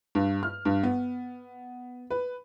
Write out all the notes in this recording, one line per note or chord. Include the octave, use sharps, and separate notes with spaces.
G2
F6
G2
B3
B4